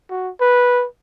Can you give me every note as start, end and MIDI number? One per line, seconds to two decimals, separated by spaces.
0.10 0.30 66
0.41 0.86 71